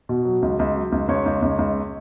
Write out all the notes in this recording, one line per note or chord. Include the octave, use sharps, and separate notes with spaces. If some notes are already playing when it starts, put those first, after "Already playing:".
B2
F#3
C#2
C#2
F#3
C#2
C#2 C#5
C#2
C#2
C#2